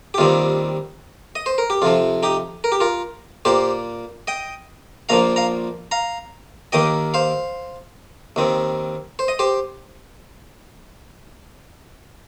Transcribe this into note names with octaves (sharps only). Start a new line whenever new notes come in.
G4
D#2 D#3 G3 C4 F4
D#5
C5
A#4
G4
F2 C3 F3 F4
D#4 G4
A#4
G4
F4 A#4
A#2 A#3 G4 C5
D#5 G5
A#1 A#2 F3 A#3 F5 A#5
F5 A#5
F5 A#5
D#2 D#3 A#3 D#5 G5
C5 F5
D#2 D#3 C4
C5
D#5
G4 C5